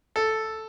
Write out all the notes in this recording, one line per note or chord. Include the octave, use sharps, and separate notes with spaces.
A4